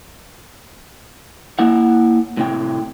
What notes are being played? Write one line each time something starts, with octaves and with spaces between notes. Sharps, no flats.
A#3 E4 F#5
A2 C3 G5